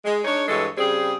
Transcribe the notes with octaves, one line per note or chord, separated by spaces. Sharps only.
G#3
D4 D#4 C#5
G2 E3 G#3 A4 C#5
C#3 G3 C4 G#4